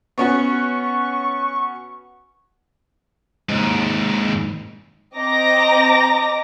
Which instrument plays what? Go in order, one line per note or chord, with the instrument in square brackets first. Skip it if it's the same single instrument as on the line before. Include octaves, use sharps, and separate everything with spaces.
[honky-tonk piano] B3 C#4 F#4 [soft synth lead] C#6
[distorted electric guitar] D#2 G#2
[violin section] C4 D#5 A#5 D6 A#6